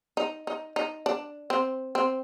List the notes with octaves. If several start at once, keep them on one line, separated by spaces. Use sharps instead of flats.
D#4
D#4
D#4
D4
C4
C4